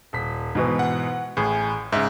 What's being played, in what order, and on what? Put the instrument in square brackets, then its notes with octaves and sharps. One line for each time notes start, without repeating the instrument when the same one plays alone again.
[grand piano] D#1 B6
G#2 B2 E3
[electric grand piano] F#5
[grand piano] A1 G#4 [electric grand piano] A2
[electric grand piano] G#2 C#3 [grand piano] E5